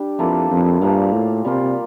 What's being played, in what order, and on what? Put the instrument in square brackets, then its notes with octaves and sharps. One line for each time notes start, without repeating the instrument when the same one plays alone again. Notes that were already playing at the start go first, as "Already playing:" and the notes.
Already playing: [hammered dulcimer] G3 D4 G4
[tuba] F2 [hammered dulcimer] E3 A#3 F4 A4
[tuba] F2
[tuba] G2 [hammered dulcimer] A#2 F3 A#3
[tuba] A2
[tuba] C3 [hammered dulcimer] G3 A#3 F4